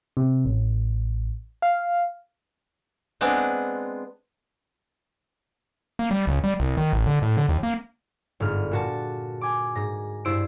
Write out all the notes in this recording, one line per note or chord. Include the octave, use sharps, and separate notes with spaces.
C3
A1
F5
G#3 B3 C4 D4
A#3
G3
C#2
G3
C2
D#3
A1
D3
A2
D3
D#2
A#3
G1 G#2 F6
A#2 F#4 A5
G#5 D6
G#2 A#6
G2 E4 C5 E6 D7